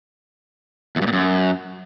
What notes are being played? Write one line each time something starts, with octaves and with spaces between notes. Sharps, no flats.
E2
G2
A#2
F#2